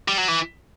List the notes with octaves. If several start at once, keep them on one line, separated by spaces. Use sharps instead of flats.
G3
F#3
E3